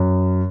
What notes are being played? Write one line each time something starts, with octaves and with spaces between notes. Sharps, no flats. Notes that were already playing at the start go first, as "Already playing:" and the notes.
Already playing: F#2